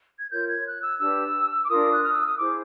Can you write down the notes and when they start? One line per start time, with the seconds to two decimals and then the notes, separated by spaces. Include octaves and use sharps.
0.19 G#6
0.31 F4 A#4 C#5 G6
0.48 G#6
0.66 F#6
0.83 E6
1.00 D4 G4 B4 E6
1.63 D6
1.70 D4 F4 A#4 D#6
1.91 F#6
2.03 F6
2.14 E6
2.27 D#6
2.38 E4 G#4 C5 D6